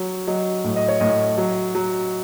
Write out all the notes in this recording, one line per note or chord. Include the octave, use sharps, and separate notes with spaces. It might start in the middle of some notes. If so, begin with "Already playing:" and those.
Already playing: F#3 C#5
F#3 D#5
A2
D#5
C#5
A2 D#5
F#3
F#3